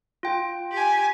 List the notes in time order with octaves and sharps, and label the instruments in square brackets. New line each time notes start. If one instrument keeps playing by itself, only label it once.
[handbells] F4 G5
[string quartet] G4 G#5